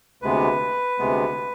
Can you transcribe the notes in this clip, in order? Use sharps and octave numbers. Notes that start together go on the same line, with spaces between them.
D2 C3 G#3 B3 B4
D2 C3 G#3 B3